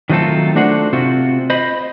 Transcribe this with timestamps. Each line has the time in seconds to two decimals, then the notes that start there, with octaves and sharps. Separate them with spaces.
0.09 D#3 F#3 A3 C4 F4 A4
0.55 A3 D4 F#4 C5 F#5
0.93 C3 C4 F4 F#4
1.50 C5 D#5 B5